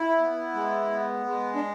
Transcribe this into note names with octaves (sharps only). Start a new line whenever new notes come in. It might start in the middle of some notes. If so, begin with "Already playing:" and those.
Already playing: E4
B3
G#3
B3
G#3
D4